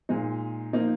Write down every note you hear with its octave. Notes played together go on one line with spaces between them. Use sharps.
A#2 G#3 D#4
F3 A#3 D#4